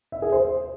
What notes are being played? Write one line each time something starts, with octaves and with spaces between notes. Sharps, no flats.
E5
G#4
C5